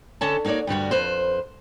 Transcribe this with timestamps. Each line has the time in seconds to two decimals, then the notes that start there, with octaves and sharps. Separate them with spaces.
0.21 D3 C#4 A4 D#5 A5
0.45 A#3 D#4 F#4 C#5 D5
0.67 D2 G2 G3 F#4
0.91 F2 B4 C5